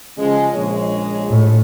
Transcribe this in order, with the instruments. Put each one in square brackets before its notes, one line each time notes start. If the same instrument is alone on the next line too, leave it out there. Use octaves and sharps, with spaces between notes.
[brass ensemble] C#3 F3 G#3
A#1 G#3 C#5
[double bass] A2